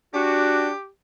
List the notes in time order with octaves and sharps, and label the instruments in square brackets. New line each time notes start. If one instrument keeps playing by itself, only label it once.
[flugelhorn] D4 [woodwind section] F#4 [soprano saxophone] G4